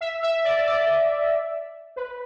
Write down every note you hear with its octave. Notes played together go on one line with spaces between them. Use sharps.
E5
E5
D5
D5
B4